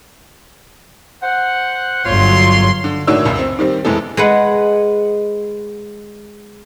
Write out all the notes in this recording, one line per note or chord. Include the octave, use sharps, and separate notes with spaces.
C5 F#5
G1 F#3 F4 C#5 C6
D3
A2 D#3 D4 F#4 C#5 E6
C#2 F#2
C4
D#3 G3 C4
F1 E3 G#3 B3 A4
G#3 B4 F#5